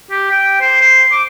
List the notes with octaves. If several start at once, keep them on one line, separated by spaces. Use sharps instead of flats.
G4
G5
C5
C5
D6